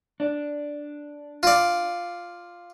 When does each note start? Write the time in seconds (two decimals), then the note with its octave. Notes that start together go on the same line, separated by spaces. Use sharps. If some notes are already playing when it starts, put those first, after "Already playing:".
0.20 D4
1.43 F4 D5